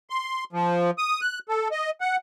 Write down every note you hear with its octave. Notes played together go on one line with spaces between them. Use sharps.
C6
F3
D#6
F#6
A4
D#5
F#5